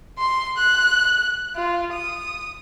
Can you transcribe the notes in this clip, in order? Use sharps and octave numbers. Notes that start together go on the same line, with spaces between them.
C6
F#6
F4
D#6